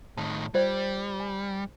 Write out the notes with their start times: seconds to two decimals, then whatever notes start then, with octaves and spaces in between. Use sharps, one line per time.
0.17 A2 D#3 A5
0.54 G3 F4 C5 D5
1.20 G#5